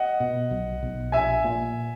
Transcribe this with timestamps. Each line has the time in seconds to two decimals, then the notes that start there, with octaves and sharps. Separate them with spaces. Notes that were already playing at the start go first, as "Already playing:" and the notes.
Already playing: D#5 F#5
0.20 B2
0.51 B1
0.82 B1
1.12 A#1 E5 G#5
1.44 A#2